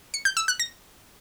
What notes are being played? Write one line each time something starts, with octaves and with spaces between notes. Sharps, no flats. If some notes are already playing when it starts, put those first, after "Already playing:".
C#7
G6
E6
F#6
A#6